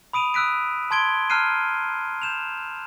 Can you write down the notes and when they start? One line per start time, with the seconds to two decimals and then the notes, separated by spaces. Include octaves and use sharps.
0.13 B5 D#6 D7 D#7 F7
0.34 D#6 E6 F#6 B6 D7
0.91 A5 C6 G#6 D7 G7
1.30 A5 A#5 F6 F#6 C7 D#7
2.22 G6 E7 F7